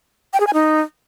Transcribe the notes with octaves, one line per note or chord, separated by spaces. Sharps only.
G5
G#4
G#5
D#4